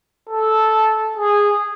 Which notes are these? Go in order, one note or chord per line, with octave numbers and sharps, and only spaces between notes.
A4
G#4